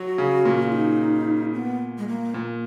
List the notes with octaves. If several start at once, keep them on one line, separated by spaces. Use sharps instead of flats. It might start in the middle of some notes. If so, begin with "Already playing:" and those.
Already playing: F#3 F#4
C#3
A#2
F4
D#4
C#4
B3
G#3
A#3
A#2